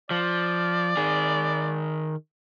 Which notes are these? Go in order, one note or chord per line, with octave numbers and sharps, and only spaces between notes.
F3 D5
D#3 G#4